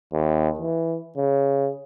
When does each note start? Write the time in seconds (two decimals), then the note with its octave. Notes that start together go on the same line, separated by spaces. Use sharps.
0.13 D#2
0.59 E3
1.17 C#3